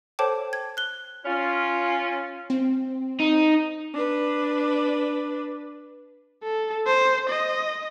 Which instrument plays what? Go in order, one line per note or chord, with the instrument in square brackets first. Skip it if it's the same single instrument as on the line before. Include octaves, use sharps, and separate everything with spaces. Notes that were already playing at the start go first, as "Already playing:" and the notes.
[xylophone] A4 C5 C#5 G5 A5 D6
G#6
F#6 G7
[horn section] C#4 F4
[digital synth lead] C4
[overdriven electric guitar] D#4
[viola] D4 B4
[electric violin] A4
C5
D#5